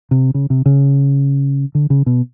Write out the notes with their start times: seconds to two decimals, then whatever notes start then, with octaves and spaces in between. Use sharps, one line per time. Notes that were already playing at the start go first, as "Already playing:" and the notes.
0.11 C3
0.34 C#3
0.50 C3
0.66 C#3
1.75 D3
1.90 C#3
2.06 B2